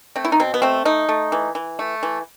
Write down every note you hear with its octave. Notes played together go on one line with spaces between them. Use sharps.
A3 C4
E4
D#4
B2 C4
B3
A3 C4
A3 D#4
A3
E3
E3
A3
E3